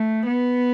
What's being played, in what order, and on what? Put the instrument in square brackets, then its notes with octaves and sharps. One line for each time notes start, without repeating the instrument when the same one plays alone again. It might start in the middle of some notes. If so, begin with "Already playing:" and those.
Already playing: [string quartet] A3
B3